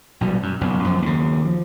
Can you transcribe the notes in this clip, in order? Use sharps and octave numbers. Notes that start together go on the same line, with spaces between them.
A#1 B2 F#3 G3
F#2
F#1 B1 F2
F#2 F3
D#2 C#3
F3